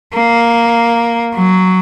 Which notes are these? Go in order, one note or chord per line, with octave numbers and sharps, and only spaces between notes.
A#3
F#3